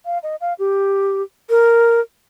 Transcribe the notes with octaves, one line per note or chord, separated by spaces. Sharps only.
F5
D#5
F5
G4
A#4